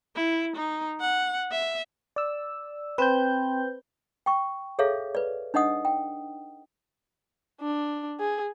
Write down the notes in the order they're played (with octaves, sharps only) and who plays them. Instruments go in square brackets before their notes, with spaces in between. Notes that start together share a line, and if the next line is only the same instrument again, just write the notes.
[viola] E4
D#4
F#5
E5
[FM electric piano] D5 E6
[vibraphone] C4 G5 [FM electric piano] B4 C5 G6
[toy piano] G5 C#6
G#4 A4 C#5 E5 F5
B4 D5
D4 D#4 D#5 F#5 D#6
G5
[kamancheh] D4
G#4